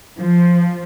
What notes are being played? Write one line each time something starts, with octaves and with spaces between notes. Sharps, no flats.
F3